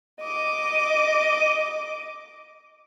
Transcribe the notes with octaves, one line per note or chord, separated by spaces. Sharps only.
D#5 D6